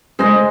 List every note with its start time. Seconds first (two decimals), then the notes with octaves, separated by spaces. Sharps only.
0.19 G#3 G#4 C5 D#5